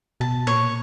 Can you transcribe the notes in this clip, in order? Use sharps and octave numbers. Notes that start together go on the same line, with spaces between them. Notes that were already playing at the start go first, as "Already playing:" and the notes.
B2 A5
A#2 C#5